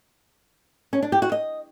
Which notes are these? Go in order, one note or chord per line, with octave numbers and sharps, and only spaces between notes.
C#4
D4
G4
F#4
D#5